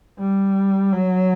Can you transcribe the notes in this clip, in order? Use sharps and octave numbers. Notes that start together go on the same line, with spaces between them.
G3
F#3